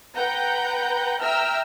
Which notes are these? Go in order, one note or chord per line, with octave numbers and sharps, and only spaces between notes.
B4 F#5 G5 A#5 G6
E5 G5 A#5 E6 F6